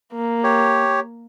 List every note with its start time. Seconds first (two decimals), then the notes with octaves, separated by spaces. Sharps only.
0.13 A#3
0.43 G4 C#5